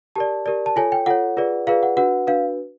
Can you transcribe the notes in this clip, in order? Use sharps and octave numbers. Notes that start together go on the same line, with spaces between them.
G4 A#4 D5 A5
G4 A#4 D5
A5
F4 A4 C#5 G#5
G5
F4 A4 C#5 F#5
F4 G#4 B4 D5
F4 G#4 B4 D5 F5
F#5
D4 F#4 B4 F#5
D4 F#4 B4 F5